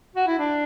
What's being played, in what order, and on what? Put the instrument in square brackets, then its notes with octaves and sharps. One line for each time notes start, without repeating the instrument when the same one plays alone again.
[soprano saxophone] F#4
E4
D4